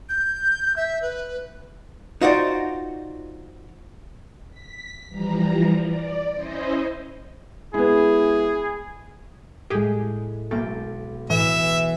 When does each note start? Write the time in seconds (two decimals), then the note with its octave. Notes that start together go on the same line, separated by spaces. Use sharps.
0.09 G6
0.76 E5
1.02 B4
2.21 D#4 F4 F#4 C5 D5 F#5
4.51 B6
5.09 E3 F3 G3 A#5
5.84 D5
6.33 C#4 E4 C5 D#5
7.74 G#3 B3 E4 G#4
9.70 A2 G#3 G4 G#4
10.51 B1 A3 A#3 G5 A6
11.30 A2 E3 E5